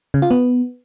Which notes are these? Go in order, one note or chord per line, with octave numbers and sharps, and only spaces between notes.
C#3
F4
B3